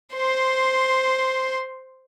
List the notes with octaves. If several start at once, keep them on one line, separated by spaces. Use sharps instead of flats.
C5 C6